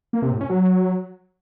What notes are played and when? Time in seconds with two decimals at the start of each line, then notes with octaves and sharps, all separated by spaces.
0.13 A#3
0.22 C3
0.31 A2
0.41 C#4
0.50 F#3